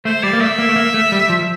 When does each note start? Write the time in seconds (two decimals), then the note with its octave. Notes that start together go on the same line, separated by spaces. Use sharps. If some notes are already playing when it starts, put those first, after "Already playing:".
0.05 A3 C5
0.23 G3 D5
0.33 A#3
0.41 A3 E5
0.59 A#3
0.69 A3
0.76 A#3
0.94 A3
1.12 G3
1.29 F3